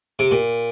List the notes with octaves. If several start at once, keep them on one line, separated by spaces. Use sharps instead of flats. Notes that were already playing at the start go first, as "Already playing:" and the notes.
C3
A#2